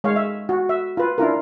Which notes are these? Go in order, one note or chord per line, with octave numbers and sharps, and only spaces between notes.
G#3 C#5 F5
E5
F#4
E5
F4 B4
D4 E4 F4 A#4